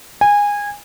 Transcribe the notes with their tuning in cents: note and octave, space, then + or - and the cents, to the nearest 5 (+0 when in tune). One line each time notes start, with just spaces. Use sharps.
G#5 -20